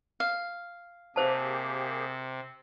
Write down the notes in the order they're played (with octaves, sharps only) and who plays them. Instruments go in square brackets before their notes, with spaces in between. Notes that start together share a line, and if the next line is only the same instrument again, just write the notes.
[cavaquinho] F5
[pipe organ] C3 [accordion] A#3 G4 G#4 [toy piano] C5 A5